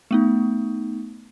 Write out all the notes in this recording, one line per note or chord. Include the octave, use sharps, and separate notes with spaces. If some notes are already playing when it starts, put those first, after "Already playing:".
A3 B3 D#4